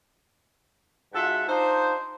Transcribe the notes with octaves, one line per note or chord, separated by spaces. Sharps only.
G#2 F4 F#4 A4 E5 F#5
D4 D#4 F4 C5